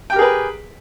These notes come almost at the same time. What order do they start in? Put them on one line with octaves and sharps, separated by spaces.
G5 G4 A#4 G#4 B4